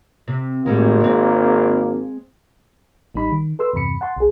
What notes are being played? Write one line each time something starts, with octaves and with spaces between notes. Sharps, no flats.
C3
G#1 A2 G3 G#3 A#3
G#3 C4
A1 G3 D#4 B5
D#3
A4 B4 C6 E6
E2 G2 C3 B5 C#7
F#5 A5 C6
B1 G#4